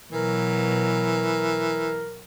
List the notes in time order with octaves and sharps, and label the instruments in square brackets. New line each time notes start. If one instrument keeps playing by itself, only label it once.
[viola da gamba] B2 F#3 [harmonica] E3 [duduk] A#4